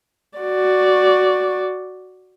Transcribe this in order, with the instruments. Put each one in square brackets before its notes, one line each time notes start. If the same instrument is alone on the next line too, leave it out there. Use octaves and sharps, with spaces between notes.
[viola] F#4 D5